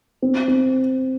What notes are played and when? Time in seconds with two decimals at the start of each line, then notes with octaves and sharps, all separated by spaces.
0.22 C4
0.48 C4